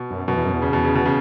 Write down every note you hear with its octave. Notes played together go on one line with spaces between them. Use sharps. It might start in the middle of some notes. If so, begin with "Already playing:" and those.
Already playing: B2
F#2
F#2 B2
E2
F#2
E2
C#3
B2
C#3
B2
C#3